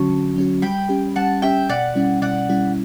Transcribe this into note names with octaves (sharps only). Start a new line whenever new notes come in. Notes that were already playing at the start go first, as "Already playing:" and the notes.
Already playing: D3 F#3 C#4 F#4 A5 C#6
D3
F#3 C#4 F#4
G3 G5 B5
C#4 G4
G3 F#5 A5
C#4 G4 E5 G5
B2 D5 F#5
G3 C#4 E4
B2 D5 F#5
G3 C#4 E4